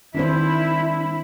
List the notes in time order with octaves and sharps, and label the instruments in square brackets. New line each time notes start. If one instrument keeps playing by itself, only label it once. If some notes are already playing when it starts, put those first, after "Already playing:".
[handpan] D#3 C4 C5 [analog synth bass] D4 [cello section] E4